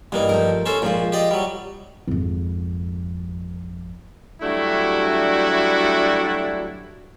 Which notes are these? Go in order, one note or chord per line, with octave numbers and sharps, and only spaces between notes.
G2 E3 A#3 D#4
F3 A3 A#4
C#4 A4 C5
A#2 F3 G#3 F4
G4 D5 D#5
F#3 G3
G#1 F2
F#3 G3 A3 D4 E4 F#4